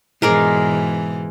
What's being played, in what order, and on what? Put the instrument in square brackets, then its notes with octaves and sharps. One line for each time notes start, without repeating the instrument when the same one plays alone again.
[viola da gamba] G#2 B2 E3 [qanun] G#3 A#4 D5